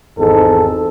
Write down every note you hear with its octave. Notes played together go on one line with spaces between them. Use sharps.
G#1 E2 G#2 A4